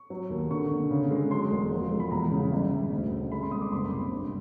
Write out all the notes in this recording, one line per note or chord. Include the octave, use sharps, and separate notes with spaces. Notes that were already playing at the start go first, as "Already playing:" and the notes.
Already playing: C#6
F#3
D#2
D3 C#6
D3
C#3
G#3
F#3 C6
E1
F3
G#3
B5
E2 A#5
C#3
G1
G1
D2
C#3
G#3 B5
C6
C2 D#6
D6
F#1 C6
B5
C3
G2